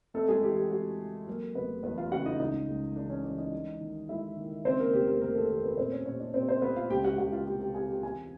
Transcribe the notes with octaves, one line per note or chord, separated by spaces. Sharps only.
F2 A3 A4
G#3 G#4
E3 G4
G4
F2 F#4
F2
F#3 A#3 A#4
F1 B3 B4
E2 B3 B4
F4 F5
C#3 F#4 F#5
D#4 D#5
C#2 D#4 D#5
C#2
E3 D4 D5
C#4 C#5
E3 D4 D5
D#4 D#5
G#3
D#3
G#3 E4 E5
D#3
C#3 C4 C5
A#3 A#4
F1 G4
A#3 A#4
F1 A#3 A#4
A3 A4
D#2 A#3 A#4
B3 B4
A#2 C4 C5
C#4 C#5
A#2 C#4 C#5
D4 D5
A#2 C4 C5
C4 C5
B3 B4
F4 F5
C#2 G4 G5
F#4 F#5
C#2 F#4 F#5
F4 F5
C3 G4 G5
G4 G5
C3 G#4 G#5
G4 G5
E2 G#4 G#5